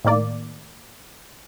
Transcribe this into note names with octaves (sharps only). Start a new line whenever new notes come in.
A2 D#3 A#3 D5